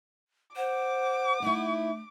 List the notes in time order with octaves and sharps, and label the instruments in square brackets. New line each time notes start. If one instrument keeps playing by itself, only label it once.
[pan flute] C5 [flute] F#5 [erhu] D6
[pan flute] A3 [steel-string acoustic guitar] D#4 E4